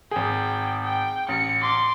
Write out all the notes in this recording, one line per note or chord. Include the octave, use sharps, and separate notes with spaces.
G#1 G#4 G5
G5
A1 C#7
C6 D6